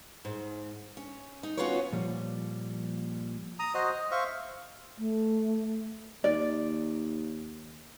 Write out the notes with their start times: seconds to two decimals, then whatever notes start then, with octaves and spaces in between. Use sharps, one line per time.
0.25 G#2
0.97 C#4
1.43 D#4
1.57 B3 C#4 F4 F#4 A#4 C#5
1.92 A#2 F3 G3 A#3
3.59 A#5 D#6
3.74 F#4 C5 D#5
3.91 D#5
4.11 C5 E5 F5 C#6
4.98 A3
6.24 D#2 D5